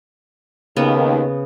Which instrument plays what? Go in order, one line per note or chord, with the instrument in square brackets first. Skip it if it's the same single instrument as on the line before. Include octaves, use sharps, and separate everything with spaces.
[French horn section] D#2 [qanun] C#3 B3